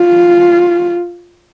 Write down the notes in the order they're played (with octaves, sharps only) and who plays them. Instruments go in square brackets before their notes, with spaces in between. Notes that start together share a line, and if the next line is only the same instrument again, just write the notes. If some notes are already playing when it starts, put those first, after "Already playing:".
Already playing: [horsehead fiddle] F4